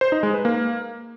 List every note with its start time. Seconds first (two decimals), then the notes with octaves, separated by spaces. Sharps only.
0.01 C5
0.12 D#4
0.23 G#3
0.34 B4
0.45 A#3